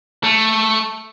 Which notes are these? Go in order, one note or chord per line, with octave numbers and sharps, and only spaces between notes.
A3